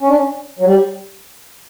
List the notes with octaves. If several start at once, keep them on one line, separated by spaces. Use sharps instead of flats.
C#4
D4
C#4
F#3
G3